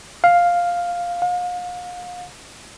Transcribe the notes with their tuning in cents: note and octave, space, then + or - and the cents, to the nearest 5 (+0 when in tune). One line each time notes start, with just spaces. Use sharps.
F5 +5
F5 +40